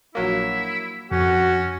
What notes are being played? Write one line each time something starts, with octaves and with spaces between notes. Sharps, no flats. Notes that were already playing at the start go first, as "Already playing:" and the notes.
A#1 F#3 A#3 E4
F2 C#4 F#4